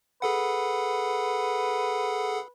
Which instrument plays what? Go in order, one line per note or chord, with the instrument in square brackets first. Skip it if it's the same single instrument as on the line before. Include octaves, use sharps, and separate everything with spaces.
[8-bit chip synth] G#4 A4 F#5 [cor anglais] B4